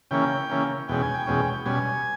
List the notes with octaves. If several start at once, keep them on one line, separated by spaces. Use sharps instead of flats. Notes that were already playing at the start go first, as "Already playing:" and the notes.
C#3 E3 A#3 C#4 G5
C#3 E3 A#3 C#4
E2 B2 G#3 C#4 G5
G#5
G5
E2 B2 G#3 C#4
B2 G3 C#4 G#5